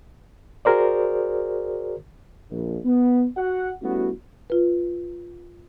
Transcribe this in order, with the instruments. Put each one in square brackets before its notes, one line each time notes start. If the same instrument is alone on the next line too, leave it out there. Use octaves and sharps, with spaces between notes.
[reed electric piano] F#4 G#4 A#4 C5 D5
[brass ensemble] A#1
B3
F#4 F#5
G3 A3 B3 C#4 E4 F#4
[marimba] F4 B4